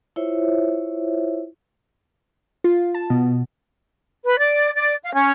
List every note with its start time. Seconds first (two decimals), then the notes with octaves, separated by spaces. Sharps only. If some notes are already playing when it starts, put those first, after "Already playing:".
0.16 E4 F4 C5 C#5 E5
2.64 F4
2.95 A5
3.10 B2
4.25 B4
4.39 D5
4.75 D5
5.03 F5
5.14 C#4